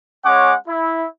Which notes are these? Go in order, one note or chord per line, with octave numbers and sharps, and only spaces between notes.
G#3 C#4 C#5 F#5 D6
E4